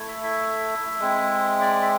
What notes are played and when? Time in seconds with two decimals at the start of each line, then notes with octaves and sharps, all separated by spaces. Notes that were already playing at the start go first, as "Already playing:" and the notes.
Already playing: A3 E4
0.08 E5
0.23 E5
1.00 G#3 C4 E4
1.61 D5
1.82 E5